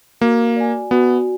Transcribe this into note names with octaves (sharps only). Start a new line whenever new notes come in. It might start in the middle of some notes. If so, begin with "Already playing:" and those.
A#3 F#4
D5 G#5
B3 F#4